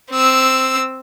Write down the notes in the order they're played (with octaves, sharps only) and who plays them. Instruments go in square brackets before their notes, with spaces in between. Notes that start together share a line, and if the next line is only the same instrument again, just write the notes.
[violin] C4 E6